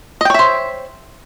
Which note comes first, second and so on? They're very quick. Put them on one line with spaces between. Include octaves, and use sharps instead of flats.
D#5 G5 C#5 E5 C5